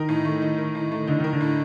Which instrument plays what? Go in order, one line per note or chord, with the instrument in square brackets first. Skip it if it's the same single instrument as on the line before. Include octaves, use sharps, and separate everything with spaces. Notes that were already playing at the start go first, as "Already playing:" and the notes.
Already playing: [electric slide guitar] D#3 [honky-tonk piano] D#4 A#4
[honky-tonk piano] A2
A3
D#4
A#4
A2
A3
[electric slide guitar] D3 [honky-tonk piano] D#4
[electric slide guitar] D#3 [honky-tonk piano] A#4
[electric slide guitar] D3
[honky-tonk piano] A2